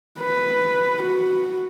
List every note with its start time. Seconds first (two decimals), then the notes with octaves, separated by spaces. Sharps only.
0.20 B4
1.03 F#4